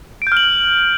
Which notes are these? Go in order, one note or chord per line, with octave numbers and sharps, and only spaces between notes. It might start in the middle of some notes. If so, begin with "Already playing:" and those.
F6 G6 D7 F#7